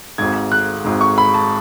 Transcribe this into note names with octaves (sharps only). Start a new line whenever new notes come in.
G#1 G#2 G#6
F#6
G#1 G#2
C#6
B5
A5